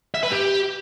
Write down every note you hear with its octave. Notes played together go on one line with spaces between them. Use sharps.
E5
B4
G4